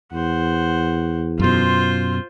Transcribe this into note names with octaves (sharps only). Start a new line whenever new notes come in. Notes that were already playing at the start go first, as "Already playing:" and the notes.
E2 C5 F#5
F#2 B2 F4 C5